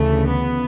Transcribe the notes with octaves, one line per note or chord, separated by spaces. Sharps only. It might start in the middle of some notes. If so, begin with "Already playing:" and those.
Already playing: D2 C#3 E3 A3
B3